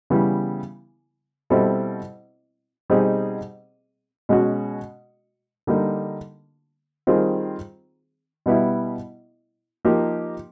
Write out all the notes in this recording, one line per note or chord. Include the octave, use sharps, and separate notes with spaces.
C#3 E3 G3 B3
B2 G3 C4 E4 A4
B2 G3 C4 D#4 G#4
B2 G#3 C#4 F#4
D3 G3 A#3 D#4
D#3 G3 C4 F4 G#4
B2 G3 B3 E4
F3 A#3 D#4 G4